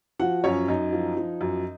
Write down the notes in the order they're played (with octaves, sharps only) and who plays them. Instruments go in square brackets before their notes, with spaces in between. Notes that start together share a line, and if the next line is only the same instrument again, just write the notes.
[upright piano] F3 F#4 F#5
F#2 C#4 C#5
F#2 D#4 D#5
F3
F3
F#2